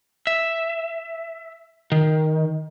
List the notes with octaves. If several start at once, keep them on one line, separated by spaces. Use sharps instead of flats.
E5
D#3